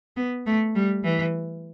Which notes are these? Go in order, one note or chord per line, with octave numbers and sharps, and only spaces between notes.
B3
A3
G3
E3